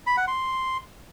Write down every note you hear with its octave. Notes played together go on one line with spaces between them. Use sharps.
B5
F#5
C6